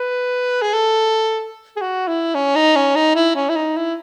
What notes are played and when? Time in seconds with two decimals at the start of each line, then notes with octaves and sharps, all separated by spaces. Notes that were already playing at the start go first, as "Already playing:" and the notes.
Already playing: B4
0.62 G#4
0.74 A4
1.77 G#4
1.81 F#4
2.08 E4
2.35 C#4
2.56 D#4
2.76 C#4
2.96 D#4
3.16 E4
3.36 C#4
3.49 E4
3.56 D#4
3.76 E4